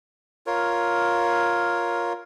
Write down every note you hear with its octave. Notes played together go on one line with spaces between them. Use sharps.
F4 A#4 C#5